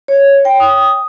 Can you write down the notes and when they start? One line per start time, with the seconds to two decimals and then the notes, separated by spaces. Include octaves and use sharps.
0.08 C#5
0.45 G5
0.60 D#6